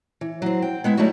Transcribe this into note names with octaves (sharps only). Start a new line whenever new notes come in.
E3
F#3 C4
G5
G#3 B3 E4
F#3 G3 A3 D#4 E4 F#4